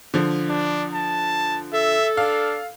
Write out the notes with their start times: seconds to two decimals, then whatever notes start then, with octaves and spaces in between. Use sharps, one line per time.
0.14 D3 F3
0.49 D4
0.94 A5
1.73 A4 E5
2.17 D4 F5